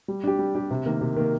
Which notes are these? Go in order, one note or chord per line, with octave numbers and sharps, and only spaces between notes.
G3
D4 G4
G3
D4 G4
C3
D#3 A#3
C3
D#3 A#3